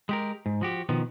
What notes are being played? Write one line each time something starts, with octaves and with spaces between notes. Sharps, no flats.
G#3 G4 A#4
G#2
F3 F#4 G4
B2 D#3 F3 B3